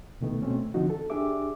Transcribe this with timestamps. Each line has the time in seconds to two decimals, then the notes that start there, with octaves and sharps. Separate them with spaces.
0.21 C2 B2 D#3 A3 B3
0.42 B2 A3 C4 C#4
0.74 D3 E3 F3 C4 D#4 F#4
0.90 A4
1.10 D4 G4 G#4 E5 D6